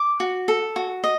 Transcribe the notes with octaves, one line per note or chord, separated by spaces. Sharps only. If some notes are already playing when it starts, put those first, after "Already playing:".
Already playing: D6
F#4
A4
F#4
D#5